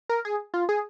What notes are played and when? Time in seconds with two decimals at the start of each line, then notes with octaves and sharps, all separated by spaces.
0.09 A#4
0.25 G#4
0.54 F4
0.69 G#4